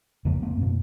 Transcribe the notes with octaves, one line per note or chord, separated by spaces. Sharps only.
F2 C#3 F3 A#3
A3 A#3 C4
F#2 B2